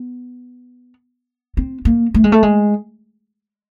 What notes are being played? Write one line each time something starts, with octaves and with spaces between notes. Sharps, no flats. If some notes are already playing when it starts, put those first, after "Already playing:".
Already playing: B3
C4
A#3
A3
G#3
A3
G#3